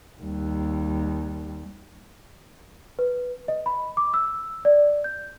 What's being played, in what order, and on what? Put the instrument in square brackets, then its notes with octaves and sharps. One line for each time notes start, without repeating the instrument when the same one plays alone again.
[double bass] D#2 G3
[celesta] B4
D#5
B5
D6
E6
D5
G6